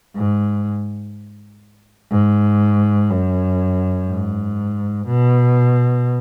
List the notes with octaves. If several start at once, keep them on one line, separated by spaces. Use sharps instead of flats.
G#2
G#2
F#2
G#2
B2